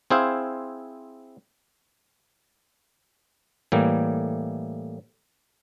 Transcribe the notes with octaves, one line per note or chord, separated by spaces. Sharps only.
C4 E4 G#4 C5 F5
A2 E3 G3 A#3